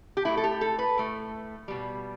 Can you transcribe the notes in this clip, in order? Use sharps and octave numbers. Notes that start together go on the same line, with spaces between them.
G4
A2 A3 E4
A4
G4
A4
B4
A2 A3
B2 G3